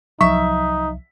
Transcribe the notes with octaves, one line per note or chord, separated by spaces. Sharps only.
C2 F3 F#3 D#4 E5 C#6